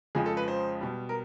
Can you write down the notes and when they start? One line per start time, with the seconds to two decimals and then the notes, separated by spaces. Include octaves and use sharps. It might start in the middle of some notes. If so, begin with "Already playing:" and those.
0.15 F2 C#3 F3 G#3 G#4
0.26 A4
0.37 B4
0.48 C5
0.81 B2 G3
1.09 A#4